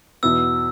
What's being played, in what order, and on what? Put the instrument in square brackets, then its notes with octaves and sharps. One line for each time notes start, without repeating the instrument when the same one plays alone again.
[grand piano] E2 B2 B3 E4 [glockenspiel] E6